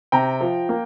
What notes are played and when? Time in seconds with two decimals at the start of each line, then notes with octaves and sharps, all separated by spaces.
0.12 C3 G5 A#5
0.41 F3
0.69 A#3